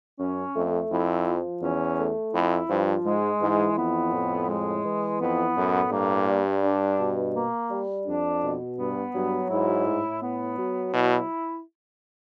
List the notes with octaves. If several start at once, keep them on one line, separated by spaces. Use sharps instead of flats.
F#2 C#4
F2 A3
F2 E4
F3
E2 C#4
A3
F2 E4
G2 F3
G#2 G#3
G#2 E3
F2 B3
A2
G#3
E3
F2 B3
F#2 A2
G2 A#3
G3
D4
B2
A#3
G3
F2 D4
B2
G2 B3
G2 F#3
G#2 E4
A2
B3
F#3
B2 E4